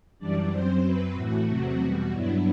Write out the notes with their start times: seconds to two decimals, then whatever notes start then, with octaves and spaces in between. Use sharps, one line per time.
0.19 F#2 E3 G3 D4 D5
0.51 F#2 F#3 C4 C5
0.83 F#2 F#3 C4 B4
1.15 A2 E3 A3 F#4
1.47 E2 C3 F#3 A3 C4
1.80 E2 B2 G3
2.12 G2 F#3 B3 D4 E4